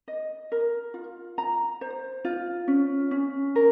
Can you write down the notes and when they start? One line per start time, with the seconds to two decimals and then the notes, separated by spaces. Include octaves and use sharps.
0.08 D#5
0.52 A#4
0.94 F4
1.38 A#5
1.81 C5
2.25 F4
2.68 C#4
3.11 C#4
3.56 A#4